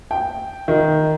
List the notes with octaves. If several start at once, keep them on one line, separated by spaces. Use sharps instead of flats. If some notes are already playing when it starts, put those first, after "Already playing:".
G5
D#3